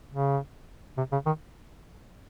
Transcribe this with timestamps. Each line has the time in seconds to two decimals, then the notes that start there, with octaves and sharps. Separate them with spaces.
0.12 C#3
0.98 C3
1.12 C#3
1.26 D#3